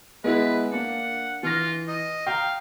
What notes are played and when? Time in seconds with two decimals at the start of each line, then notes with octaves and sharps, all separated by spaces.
0.24 G#3 B3 E4 B4
0.72 A#3 D4 F#5
1.43 E3 F4 F6 A#6
1.88 D#5
2.27 F5 G5 A#5